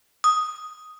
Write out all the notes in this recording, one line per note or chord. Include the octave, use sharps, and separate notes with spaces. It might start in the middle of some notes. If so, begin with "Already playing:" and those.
D#6